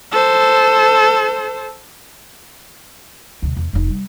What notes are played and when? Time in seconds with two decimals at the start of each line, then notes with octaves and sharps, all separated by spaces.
0.12 A4 C5
3.42 D2 B2
3.57 E2
3.73 F1 D#4
3.89 G3